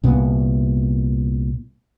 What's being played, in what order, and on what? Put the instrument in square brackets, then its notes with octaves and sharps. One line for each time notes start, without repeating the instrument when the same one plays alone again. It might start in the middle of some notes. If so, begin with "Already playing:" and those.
[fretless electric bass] C2 A#2 B3